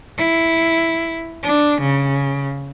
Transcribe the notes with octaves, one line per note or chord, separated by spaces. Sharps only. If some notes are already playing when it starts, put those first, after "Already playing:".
E4
D4
C#3